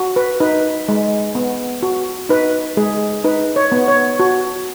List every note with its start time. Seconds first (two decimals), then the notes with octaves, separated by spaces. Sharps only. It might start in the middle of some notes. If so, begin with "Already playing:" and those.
Already playing: F#4
0.16 B4
0.40 D#4 B4
0.88 G#3
1.35 B3
1.83 F#4
2.29 D#4 B4
2.77 G#3 G#4
3.24 D#4 B4
3.56 C#5
3.72 B3
3.88 C#5
4.20 F#4